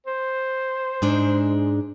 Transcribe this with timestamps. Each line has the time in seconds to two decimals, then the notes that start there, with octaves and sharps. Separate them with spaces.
0.07 C5
1.02 G#2 G#3 D4